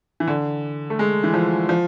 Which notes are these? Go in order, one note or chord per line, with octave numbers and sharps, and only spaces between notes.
E3
D3
A3
G#3
E3
F3
F3